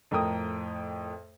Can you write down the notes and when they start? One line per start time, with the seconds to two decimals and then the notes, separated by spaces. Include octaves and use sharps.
0.11 F2 A2 A#4 G5 D#6